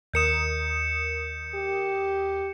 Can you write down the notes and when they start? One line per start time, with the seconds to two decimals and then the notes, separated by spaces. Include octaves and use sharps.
0.14 D#2 A#4 D#6 G6 C#7 E7
1.55 G4